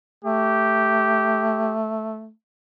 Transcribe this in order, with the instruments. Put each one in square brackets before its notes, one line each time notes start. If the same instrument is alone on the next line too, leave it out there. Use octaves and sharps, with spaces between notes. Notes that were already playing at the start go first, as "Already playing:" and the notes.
[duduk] A3 [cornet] G4